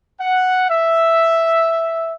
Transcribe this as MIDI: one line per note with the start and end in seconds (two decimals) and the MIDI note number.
0.20 0.69 78
0.70 2.14 76